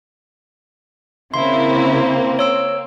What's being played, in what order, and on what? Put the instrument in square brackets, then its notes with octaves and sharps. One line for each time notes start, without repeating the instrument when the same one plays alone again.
[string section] C#3 E4 [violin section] A#3 C4 [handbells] C6
[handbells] C#5 E6 D7